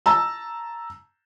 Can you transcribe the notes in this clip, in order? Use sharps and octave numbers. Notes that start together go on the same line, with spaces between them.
A5 A#5 E6